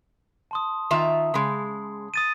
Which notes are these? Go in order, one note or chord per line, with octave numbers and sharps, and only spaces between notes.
A5 C6 D#6
D#3 F4 E5
C#3 G#3
D#6 A6 D#7